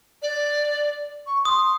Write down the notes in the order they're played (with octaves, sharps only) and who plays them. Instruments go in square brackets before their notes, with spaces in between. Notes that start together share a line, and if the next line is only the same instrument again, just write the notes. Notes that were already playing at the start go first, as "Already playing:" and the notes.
[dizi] D5
C#6
[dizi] C6 [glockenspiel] D#6